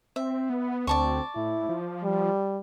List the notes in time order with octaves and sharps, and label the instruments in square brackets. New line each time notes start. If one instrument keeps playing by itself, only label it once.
[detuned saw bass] C4 [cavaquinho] E5
[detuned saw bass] B3
[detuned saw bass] D2 [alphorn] C4 [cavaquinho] D5 A5 C#6
[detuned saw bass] A2 [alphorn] E4
[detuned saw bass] F3
[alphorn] G3